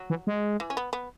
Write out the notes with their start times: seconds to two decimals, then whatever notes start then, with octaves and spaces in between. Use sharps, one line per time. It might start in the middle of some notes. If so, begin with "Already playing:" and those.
Already playing: F#3
0.10 E3
0.27 G#3
0.60 E3
0.70 C#4
0.77 B3
0.93 B3